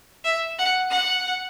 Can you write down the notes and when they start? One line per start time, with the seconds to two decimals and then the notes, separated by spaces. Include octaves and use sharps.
0.25 E5
0.59 F#5
0.91 F#5